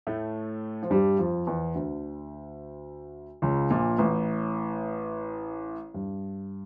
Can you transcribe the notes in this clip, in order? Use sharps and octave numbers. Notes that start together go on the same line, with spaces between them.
A2 A3
F3
G2 G3
F2 F3
E2 E3
D2 D3
C#2 C#3
A#1 A#2
A1 A2
G2